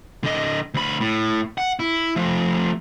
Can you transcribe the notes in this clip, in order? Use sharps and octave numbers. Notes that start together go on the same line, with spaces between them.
D3 D#5
D2 B5
A2
F#5
E4
F3 A3